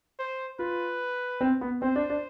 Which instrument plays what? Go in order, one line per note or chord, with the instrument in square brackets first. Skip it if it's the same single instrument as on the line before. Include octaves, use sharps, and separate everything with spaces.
[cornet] C5
[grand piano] F4 [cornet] B4
[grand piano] C4
B3
[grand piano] C4 [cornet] C5
[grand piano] D4
D4